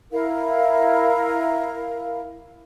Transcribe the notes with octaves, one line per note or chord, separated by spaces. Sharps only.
E4 A#4 F5